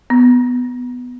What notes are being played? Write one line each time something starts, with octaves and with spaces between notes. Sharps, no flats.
B3